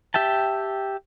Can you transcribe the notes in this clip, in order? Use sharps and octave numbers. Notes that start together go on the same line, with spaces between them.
G4 E5 G5 A5